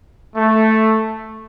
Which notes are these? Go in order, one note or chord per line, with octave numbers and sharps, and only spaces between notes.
A3